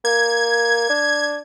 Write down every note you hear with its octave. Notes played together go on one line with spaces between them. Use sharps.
A#3 G#6
D4